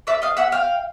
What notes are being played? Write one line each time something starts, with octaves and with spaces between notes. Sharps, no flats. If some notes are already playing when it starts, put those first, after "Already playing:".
D5 E5
D#5 F5
E5 F#5
F5 G5